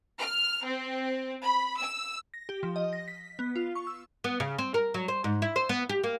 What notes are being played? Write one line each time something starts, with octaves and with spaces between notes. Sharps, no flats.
F6
C4
B5
E6
A#6
G4
F3
D#5
A#6
B6
B3
F4
C#6
E6
B3
C#3
C4
A#4
F#3
C5
G#2
E4
C5
B3
G4
A#3